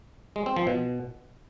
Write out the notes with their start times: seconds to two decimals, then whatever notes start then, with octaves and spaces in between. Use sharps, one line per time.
0.36 G#3
0.46 C4
0.56 F3
0.67 B2